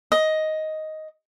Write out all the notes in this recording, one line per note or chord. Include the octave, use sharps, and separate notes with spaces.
D#5